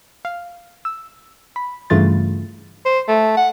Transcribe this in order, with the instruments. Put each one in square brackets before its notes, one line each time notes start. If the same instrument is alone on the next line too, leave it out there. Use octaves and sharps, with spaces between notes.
[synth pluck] F5
E6
B5
G2 C#3 E3 A3 F4 A6
[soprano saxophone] C5
A3
F#5